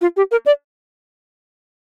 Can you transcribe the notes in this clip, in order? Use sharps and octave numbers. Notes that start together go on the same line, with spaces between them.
F4
G4
A#4
D5